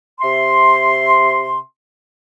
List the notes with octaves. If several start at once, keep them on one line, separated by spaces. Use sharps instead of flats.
C3 E5 C6